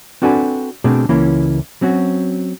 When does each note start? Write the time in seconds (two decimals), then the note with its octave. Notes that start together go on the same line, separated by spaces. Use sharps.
0.22 C4 D4 F#4 A4 B4 G#5
0.84 B2 A3 C4 D4 F#4 G#4
1.09 C#2 E3 A#3 C#4 E4
1.81 F#3 C4 C#4 F#4